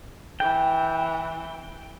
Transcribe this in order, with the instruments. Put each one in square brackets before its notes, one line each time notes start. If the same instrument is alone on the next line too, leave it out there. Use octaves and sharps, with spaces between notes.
[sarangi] E3 [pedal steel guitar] G5